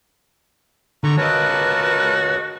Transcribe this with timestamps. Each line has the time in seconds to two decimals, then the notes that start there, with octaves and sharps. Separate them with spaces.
1.04 D3 A#5 C#6
1.18 F#4 A#4 B4 C#5 D#5 A5